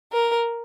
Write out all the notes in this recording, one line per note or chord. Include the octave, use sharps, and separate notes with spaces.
A#4